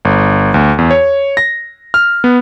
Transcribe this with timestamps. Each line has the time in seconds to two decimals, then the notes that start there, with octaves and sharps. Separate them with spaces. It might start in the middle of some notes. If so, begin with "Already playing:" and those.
0.05 G1
0.54 D2
0.78 E2
0.91 C#5
1.37 A#6
1.94 F6
2.24 B3